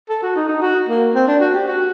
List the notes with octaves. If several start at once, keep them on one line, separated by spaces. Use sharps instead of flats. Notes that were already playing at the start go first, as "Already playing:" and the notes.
A4
F#4
D#4
D#4
F#4
A#3
C4
D4
F#4
G4
F#4